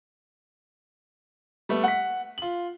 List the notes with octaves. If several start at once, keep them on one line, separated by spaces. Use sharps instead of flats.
G3 A3 B3
F#5 B6
F4 F#7